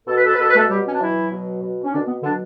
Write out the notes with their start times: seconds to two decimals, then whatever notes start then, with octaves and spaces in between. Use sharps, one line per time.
0.07 B2 A4
0.16 B4
0.24 A4
0.32 B4
0.38 B2 A4
0.48 B4
0.55 A3 A4
0.69 F#3 G3 G4
0.85 C#4
0.93 D4
1.00 E3 F#3 E4
1.31 B2
1.62 B2
1.84 C#4
1.92 B2 D3 D4
2.08 B3
2.23 D3 F#3 D4